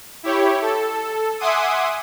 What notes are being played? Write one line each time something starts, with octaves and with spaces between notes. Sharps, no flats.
E4 G4 C#5
A4
E5 F#5 G#5 C6 D6 D#6